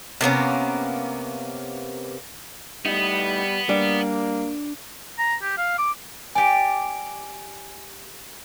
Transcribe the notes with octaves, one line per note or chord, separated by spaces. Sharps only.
C3 A#3 B3 C#4
A2 G3 B3 D#4
G3 A#3 D4
A#5
G4
F5
D6
G4 D5 G#5 D7